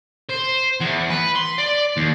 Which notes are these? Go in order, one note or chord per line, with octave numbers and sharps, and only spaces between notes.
C5
E2
B4
C6
D5
D#2